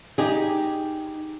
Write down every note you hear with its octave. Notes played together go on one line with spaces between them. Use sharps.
D#4 G4 G#4